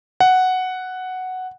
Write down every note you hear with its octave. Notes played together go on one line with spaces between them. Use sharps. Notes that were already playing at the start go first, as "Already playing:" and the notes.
F#5